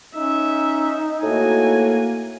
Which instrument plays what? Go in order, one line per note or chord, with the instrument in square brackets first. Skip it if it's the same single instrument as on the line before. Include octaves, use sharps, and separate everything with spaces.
[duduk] C#4 [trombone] D#4 [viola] E5
[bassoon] A2 [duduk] A#3 [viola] F#4 G#5